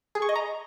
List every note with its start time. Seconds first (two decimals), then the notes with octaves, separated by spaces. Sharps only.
0.15 G#4
0.22 C#6
0.29 D#5
0.36 A#5